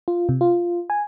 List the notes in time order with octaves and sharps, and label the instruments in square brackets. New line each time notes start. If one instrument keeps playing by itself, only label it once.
[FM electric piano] F4
C3
F4
G#5